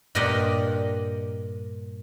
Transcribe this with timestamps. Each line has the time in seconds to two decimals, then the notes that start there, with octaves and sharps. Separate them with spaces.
0.15 G2 A#2 G4 A#4 D#5 F#5